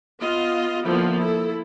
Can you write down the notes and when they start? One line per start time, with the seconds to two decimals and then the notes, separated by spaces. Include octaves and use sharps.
0.20 B3 F4 D#5
0.86 D3 F3 A#3 B3 E4
1.18 E4 A4